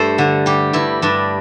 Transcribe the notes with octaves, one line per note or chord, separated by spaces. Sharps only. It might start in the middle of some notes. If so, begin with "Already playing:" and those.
Already playing: G2 A3 A4 C5
D3
G3 G4
G2 E4
G2 D4